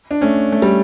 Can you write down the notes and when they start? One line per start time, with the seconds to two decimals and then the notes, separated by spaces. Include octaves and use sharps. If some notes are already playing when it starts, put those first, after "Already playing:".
0.11 D4
0.21 A3 C#4
0.52 A3
0.62 G3